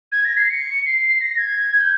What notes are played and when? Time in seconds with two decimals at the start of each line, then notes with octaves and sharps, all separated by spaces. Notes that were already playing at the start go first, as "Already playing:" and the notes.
0.12 G#6
0.25 A#6
0.37 C7
0.50 C#7
0.86 C7
1.21 A#6
1.38 G#6
1.80 G6